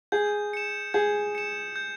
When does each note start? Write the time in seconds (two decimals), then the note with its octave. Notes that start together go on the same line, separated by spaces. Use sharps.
0.12 G#4 G6
0.53 C#7 E7
0.94 G#4 G6
1.35 C#7 E7
1.76 G6